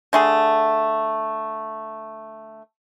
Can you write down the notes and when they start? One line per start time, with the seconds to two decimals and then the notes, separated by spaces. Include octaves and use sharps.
0.13 D3 A3 G#4